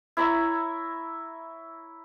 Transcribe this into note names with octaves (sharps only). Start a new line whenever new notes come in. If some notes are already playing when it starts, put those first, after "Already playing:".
E4 C#5 E5 A#5